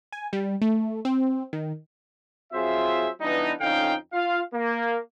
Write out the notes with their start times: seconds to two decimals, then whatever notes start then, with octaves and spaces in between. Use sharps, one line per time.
0.12 G#5
0.33 G3
0.62 A3
1.05 C4
1.53 D#3
2.53 F#3 C4 F4 G#4 C5 E5
3.20 E3 G3 B3 D4 D#4
3.60 F2 D3 C#4 D#4 F5 G5
4.13 F4 F5
4.54 A#3